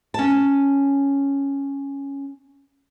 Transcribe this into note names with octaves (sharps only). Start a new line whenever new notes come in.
C#4 A5